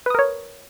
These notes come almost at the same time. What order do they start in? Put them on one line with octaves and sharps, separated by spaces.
B4 D#6 A#4 C#5